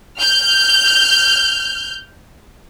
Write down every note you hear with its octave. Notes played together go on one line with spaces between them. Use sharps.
F6 G6